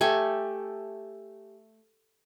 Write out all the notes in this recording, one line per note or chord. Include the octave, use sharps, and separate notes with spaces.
A3 G4 G#5